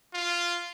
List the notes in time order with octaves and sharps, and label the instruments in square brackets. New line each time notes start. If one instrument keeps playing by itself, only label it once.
[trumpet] F4